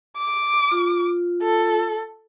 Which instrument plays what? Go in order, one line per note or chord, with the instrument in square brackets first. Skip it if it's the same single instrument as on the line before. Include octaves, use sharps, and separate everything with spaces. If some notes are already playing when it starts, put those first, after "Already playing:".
[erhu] D6
[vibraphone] F4
[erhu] A4